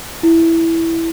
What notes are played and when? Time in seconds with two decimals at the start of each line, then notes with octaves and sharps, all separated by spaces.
0.23 E4